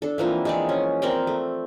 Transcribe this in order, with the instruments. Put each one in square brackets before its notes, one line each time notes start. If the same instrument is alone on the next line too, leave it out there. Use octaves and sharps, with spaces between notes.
[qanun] D4 A4
E3 F3 A#3 C4
G#3 C4 D5
C#4
C4 A#4 D5 G5
A3